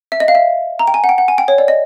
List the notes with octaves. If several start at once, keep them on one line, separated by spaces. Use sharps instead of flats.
E5
D#5
F5
E5
A#5
G5
G#5
F#5
G5
F#5
G#5
G5
C#5
D5
D#5